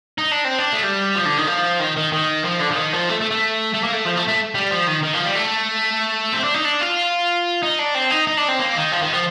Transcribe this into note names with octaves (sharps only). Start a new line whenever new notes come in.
D#4
D4
C4
D4
A3
G3
F3
D3
D#3
F3
D#3
D#3
D#3
F3
D3
F3
D#3
F3
A3
A3
A3
A3
A#3
A3
F3
A3
A3
G3
F3
D#3
D#3
F3
G3
A3
C4
D4
D#4
D4
F4
D#4
D4
C4
D#4
D#4
D4
C4
A#3
D#3
F3
D#3
F3